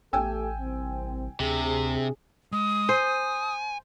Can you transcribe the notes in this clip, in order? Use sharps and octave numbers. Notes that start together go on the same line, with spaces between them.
A1 A3 G4 A4 G5 G#5 E6
C2 C4
D2 C3 D4 G#4
G#3 D#6
C5 G#5